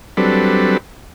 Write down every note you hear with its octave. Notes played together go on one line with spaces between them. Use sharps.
F#3 G3 C4 D4 A4 B4